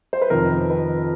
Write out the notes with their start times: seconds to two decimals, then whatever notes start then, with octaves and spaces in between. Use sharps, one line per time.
0.13 C5
0.22 B4
0.30 F2 C3 D#3 A#4
0.70 B4